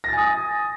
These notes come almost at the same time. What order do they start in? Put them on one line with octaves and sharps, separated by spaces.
A#6 A6 G#5 D#6